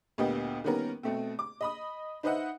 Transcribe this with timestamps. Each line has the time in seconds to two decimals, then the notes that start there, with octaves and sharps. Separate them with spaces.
0.18 D2 A#2 D3 B3 G4 D#5
0.64 D#3 G3 A#3 B3 C#4 A#4
1.03 B2 A3 C4
1.39 D6
1.61 D#5 B5 D#6
2.23 D#4 B4 C5 D#5 E5 F#5